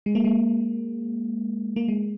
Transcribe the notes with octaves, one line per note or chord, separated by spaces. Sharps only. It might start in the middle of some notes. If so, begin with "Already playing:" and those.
G#3
A#3
G#3
A#3
G#3